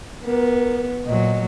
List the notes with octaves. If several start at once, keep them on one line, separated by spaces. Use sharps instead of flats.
B3 A#4
A#2 F#3 D#5